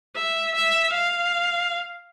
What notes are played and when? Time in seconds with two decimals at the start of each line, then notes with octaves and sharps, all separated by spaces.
0.16 E5
0.55 E5
0.93 F5